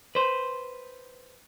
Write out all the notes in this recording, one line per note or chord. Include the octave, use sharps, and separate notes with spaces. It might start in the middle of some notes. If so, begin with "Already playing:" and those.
B4 C5